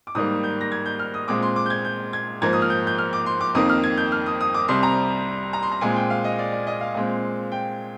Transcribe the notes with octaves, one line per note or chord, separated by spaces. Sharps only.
D6
G#2 D#3 G3 A#3 D#6
G6
A#6
G#6
G6
F6
D#6
A#2 G#3 C4 D6
C6
D6
G6
G#6
G6
G#6
G#2 F3 A#3 G#6
D#6
F6
G6
G6
F6
D6
C6
D6
F2 D#3 A#3 D#6
F6
G#6
G6
F6
D#6
D#6
D6
C2 C3 G3 C6
A#5
A#5
C6
A#5
A#2 G#3 C4 G#5
G5
F5
D#5
D5
D5
D#5
F5
A#2 G#3 C4
G5